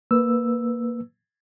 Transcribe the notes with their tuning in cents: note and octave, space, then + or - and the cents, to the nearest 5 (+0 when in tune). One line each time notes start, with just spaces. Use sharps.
A#3 +0 B4 +0 E6 +0